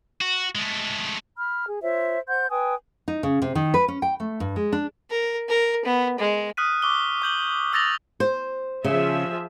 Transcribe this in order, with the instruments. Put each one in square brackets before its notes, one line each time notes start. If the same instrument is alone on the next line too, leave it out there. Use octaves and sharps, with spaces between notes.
[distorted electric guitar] F#4
G#3 A3
[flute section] B5 F6
G#4
F4 C5 C#5 E5
C5 F#5 C6 G6
B4 G5 G#5 D#6
[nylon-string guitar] D#4
C#3
C3
D#3
B4
C#4
G5
A3
G2
G#3
D4
[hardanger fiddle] A#4
A#4
B3
G#3
[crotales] D#6 F6 F#6 B6 D#7
C#6 D6 G7
D6 G6 F#7 G7
D#6 E6 A6 A#6 F7 F#7
[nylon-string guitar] C5
[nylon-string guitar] C#3 [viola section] F3 G#4 E5